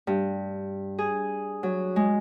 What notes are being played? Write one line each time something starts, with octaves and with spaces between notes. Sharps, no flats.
G2
G#4
F#3
G#3